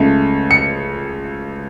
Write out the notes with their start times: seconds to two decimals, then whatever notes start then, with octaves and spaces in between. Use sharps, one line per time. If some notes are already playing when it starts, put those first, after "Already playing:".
Already playing: C#2 C#3 A3
0.51 C#7